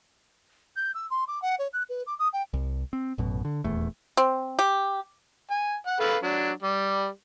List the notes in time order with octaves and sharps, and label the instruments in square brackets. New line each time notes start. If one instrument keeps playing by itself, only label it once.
[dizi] G6
E6
C6
D6
F#5
C#5
F#6
B4
D6
D#6
G5
[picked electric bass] C2
C4
A1 F#2 B2
D3
D#1 E2 A3
[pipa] C4
G4
[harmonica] G#5
F#5
A4 B4 F5
F#3 D4
G3